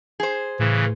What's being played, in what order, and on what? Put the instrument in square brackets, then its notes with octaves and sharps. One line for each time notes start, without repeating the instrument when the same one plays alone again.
[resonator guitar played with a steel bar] G#4 C5
[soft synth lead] A2 [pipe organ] C#3 E3